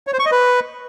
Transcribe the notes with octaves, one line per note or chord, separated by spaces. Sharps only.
C#5
C5
C#6
D#5
B4